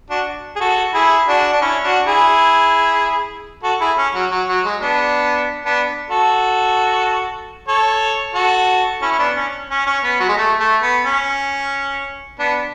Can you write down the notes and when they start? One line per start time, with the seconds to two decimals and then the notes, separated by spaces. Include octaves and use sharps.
0.10 D4 F#4
0.56 G#4
0.60 F#4 A4
0.94 E4 G#4
1.28 D4 F#4
1.53 D4
1.62 C#4 E4
1.84 D4 F#4
2.06 E4 G#4
3.63 F#4 A4
3.80 E4 G#4
3.97 C#4
4.14 F#3
4.31 F#3
4.48 F#3
4.64 G#3
4.81 B3 D4
5.65 B3 D4
6.10 F#4 A4
7.68 A4 C#5
8.35 F#4 A4
9.02 C#4 E4
9.12 C#4
9.19 B3 D4
9.36 C#4
9.70 C#4
9.86 C#4
10.04 B3
10.20 F#3
10.29 G#3
10.37 A3
10.60 A3
10.82 B3
11.05 C#4
12.39 B3 D4